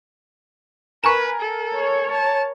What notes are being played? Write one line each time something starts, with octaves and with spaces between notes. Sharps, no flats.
A#4 B4 G#5 A#5 C#6 E7
A4
C#5
A5